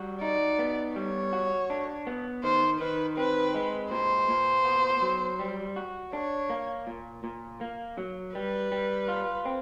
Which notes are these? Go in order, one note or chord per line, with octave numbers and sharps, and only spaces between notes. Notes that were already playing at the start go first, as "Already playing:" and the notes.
Already playing: G3 F#4
D#4 D5
B3
G3 C#5
F#4
D4
B3
D#3 C5
D#3 B4
C4 B4
G#3
A#2 C5
A#2
B3
F#3
G3
F#4
D4 C#5
A#3
A#2
A#2
A#3
F#3
G3 B4
G3
F4
C4